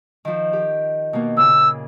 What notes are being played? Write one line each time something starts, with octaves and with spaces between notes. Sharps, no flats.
D#3 F3
G4
B2 A#3
A#2 C#3 E6